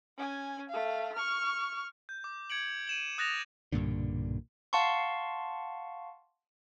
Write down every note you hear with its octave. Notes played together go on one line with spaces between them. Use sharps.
C#4 G#5
A3 F5
C#6 F6
G6
D6
G#6 C#7 D7 F#7
D#7 E7 F#7
D#6 F#6 A6 A#6 E7 F7
B1 G2 A#2 D3
F5 F#5 A5 C6 C#6